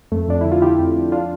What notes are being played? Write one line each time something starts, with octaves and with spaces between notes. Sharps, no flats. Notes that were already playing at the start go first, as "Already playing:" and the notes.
F2 A3
F2 D4
D3 E4
F4
D3 E4 G4
F2
F2
D4 F4